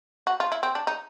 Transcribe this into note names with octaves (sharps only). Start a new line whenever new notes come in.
F#4
F4
E4
C4
D4
D#4